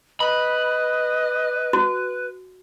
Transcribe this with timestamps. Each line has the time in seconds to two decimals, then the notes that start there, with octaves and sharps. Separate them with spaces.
0.20 B4 D#5 B5
1.73 F#4